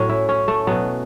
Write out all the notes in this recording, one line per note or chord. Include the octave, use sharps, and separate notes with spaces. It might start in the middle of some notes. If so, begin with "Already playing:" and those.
Already playing: A2 F#3 C#4
E4
C#4
A3
B2 F#3 B3